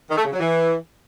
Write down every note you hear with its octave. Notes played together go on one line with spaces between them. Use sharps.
D#3
A3
C#3
F#3
E3